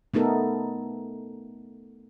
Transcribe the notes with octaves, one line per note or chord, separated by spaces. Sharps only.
A3 B3 D#4 A4 A#4